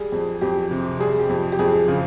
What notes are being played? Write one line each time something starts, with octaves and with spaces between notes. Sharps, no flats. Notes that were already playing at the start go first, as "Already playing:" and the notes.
Already playing: G3 G#4
F2
F2 G4
C3
G3 G#4
G4
F2
G4
F2 G#4
C#3